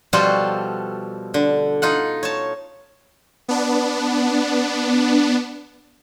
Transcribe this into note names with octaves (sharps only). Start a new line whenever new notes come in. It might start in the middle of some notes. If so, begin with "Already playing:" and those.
B2 F3 G3 F4 F#4 A4
D3
D#4 F4 F#5
C#5 A5
B3 D4